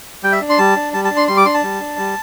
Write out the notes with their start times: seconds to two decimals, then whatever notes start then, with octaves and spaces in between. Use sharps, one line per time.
0.23 G3 G5
0.32 E5
0.41 D4
0.50 C6
0.58 G3 A5
0.76 D4
0.93 G3 A5
1.05 A5
1.11 D4
1.17 C6
1.28 G3 C6
1.37 D6
1.45 D4 C6
1.54 A5
1.63 G3
1.80 D4
1.98 G3